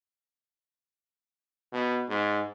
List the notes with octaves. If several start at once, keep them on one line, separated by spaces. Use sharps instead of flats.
B2
G#2